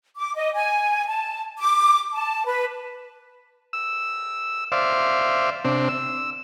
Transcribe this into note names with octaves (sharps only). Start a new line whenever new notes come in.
D6
D#5
G#5
A5
D6
A5
B4
E6
C5 D5 E5 F5
C3 C4 D4
E6